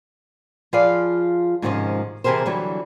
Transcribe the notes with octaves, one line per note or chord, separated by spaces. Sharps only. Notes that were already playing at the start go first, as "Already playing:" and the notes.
F3 F4 G#4 B4 D5 F5
G#2 C3 D#3 F3 G#3 C#4
C3 E3 G4 G#4 A#4 C5
D3 E3 F#3 G3